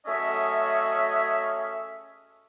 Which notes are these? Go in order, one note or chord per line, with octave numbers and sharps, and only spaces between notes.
F#3 A3 C#4 G#4 D#5 E5